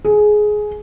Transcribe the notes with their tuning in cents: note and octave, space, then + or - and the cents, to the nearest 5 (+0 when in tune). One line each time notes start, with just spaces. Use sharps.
G#4 +15